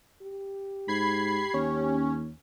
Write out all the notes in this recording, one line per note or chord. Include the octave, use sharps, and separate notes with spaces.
G4
G#2 B5 G#6 C7
D#2 C#4